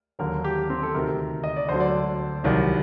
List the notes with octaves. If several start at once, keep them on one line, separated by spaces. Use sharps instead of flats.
D#2 D3 F#3 A#4
G4
C4
A4
D2 C3 D#3 A#4
D#5
D5
D2 D3 F#3 C5
D5
C2 C3 D#3 F#3